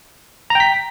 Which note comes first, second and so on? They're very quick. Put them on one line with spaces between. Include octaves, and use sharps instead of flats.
A#5 G5 B6